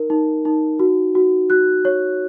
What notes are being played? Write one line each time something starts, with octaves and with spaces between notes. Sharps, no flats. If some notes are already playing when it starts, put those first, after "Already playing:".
Already playing: D#4 A#4
D#4
D#4
F#4
F#4
F#4 F#6
C#5